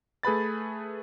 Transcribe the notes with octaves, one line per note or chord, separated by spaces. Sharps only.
A3 G#4 B4 B5 A6